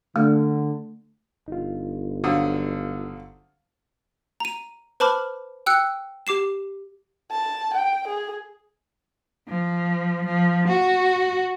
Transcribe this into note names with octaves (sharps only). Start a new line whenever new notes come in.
D3 A3
G1 D#4 F4
D3 F#3 C4 F5 D#6
A#5 D#7
B4 C5 A5 B5 D6 F6
G5 E6 F#6 C#7
G4 D6 C7 E7
A5
G5
G#4
F3
F3
F#4